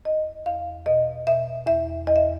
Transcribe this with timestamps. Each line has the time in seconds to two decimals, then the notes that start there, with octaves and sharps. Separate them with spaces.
0.05 E2 D#5
0.46 E2 F5
0.86 B2 D#5
1.27 B2 E5
1.67 E2 E5
2.07 E2 D#5
2.16 E5